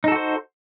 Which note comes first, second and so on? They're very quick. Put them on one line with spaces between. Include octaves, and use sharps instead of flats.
D#4 A4 F#4 C5